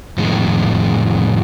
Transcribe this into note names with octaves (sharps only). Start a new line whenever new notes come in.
F2 A2 D#3 G#3